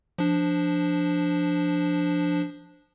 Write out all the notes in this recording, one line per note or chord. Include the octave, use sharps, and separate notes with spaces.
F3 D4